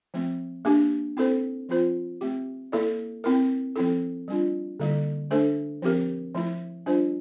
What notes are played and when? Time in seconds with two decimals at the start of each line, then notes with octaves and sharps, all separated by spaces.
0.14 F3 A3 C4
0.65 A#3 D4 G4
1.17 C4 E4 A4 C5
1.69 F3 C4 F4 C5
2.21 A3 C4 G4
2.72 A#3 E4 A4 D5
3.24 C4 E4 A#4
3.76 F3 C4 E4 A4
4.28 G3 D4 F4
4.80 D3 G3 A#3 E4 A4
5.31 A3 D4 A4 C5
5.82 F3 C4 G4 A#4
6.34 F3 A3 E4
6.86 G3 D4 F4 C5